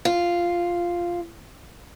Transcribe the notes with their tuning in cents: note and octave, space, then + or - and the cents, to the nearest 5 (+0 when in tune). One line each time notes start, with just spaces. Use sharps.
F4 -5